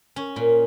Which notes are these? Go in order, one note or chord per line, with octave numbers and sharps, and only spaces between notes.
C#4
A#2